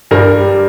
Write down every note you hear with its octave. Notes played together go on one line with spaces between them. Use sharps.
G2 A#4
G3